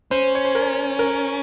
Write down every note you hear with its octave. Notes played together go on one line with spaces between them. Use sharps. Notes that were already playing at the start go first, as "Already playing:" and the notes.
C#4 C5
C#5
C5
A#4
A#4